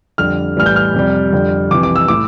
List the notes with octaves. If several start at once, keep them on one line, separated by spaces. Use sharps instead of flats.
F2 D3 G3 F6
A2 E3 G3 F6
G6
F6
F2 C3 G3
F2 D3 G3
F2 C3 E3 D6
D6
E6
A2 D6